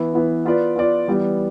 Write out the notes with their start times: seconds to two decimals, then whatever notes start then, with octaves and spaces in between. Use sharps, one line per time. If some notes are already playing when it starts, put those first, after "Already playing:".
Already playing: E3 B3 E4
0.14 E3 B3 E4
0.45 B3 F4 B4 D5
0.76 B3 F4 B4 D5
1.08 E3 G3 B3